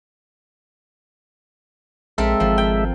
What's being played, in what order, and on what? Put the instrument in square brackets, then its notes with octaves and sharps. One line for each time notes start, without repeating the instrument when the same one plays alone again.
[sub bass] A#1 [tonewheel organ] G#3 E5 [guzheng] C4 A4 A#4
[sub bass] G#1 [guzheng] F3
[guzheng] G5